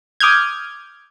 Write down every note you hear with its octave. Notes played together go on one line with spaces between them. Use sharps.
D6 D#6 F6 G6 G#6